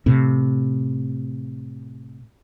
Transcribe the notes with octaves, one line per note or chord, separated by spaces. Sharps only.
A2 C3